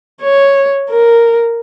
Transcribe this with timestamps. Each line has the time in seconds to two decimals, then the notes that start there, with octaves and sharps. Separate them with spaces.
0.22 C#5
0.89 A#4